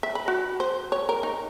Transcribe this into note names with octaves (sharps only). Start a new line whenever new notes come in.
E5
B5
F#4
C5
C#5
A#4
D#4